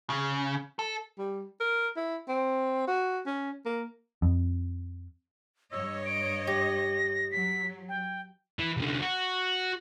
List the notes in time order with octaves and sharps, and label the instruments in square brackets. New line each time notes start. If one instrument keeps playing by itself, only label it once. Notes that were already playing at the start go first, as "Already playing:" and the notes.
[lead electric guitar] C#3
A4
[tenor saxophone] G3
A#4
E4
C4
F#4
C#4
A#3
[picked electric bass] F2
[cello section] G2 C#5 D#5 [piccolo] E6
[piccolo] D7
[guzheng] G4 [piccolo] A#6
[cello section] F#3 [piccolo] B6
[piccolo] G5
[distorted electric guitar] E3
C2 D3
F#4